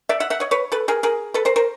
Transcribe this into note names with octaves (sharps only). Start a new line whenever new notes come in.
D5 E5
E5 F#5
E5 F#5
C#5 D#5
B4 C#5
A4 B4
G#4 A#4
G#4 A#4
A4 B4
A#4 C5
A#4 C5